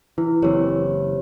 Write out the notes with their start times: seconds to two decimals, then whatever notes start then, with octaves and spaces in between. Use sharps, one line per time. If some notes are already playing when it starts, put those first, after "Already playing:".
0.18 E3 E4
0.42 F#1 E3 C4 G4 B4 C#5